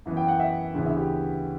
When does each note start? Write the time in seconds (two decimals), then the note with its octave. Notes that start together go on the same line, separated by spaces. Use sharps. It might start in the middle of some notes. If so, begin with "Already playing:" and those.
0.06 F#2 E3 B3
0.17 G5
0.28 F#5
0.40 E5
0.74 D2 C#3 E3 B3
0.86 E5
0.97 G4